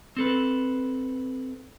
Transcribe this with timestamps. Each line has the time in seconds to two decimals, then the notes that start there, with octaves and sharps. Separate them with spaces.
0.17 C4 A4 B4